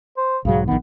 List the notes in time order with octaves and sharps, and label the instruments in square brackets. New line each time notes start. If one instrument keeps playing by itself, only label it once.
[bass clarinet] C5
[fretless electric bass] B1 G#2 F#3 [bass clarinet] C#3
[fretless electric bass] A#1 D#3 [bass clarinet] B3